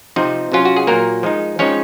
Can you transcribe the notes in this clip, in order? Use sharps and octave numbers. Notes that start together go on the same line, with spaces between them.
C3 F3 C4 D#4
C3 F#3 C#4 F4
F#4
G#4
A#2 F#3 A#3 A#4
F3 G#3 D#4
F3 G#3 C4 C#4 D#4 C#5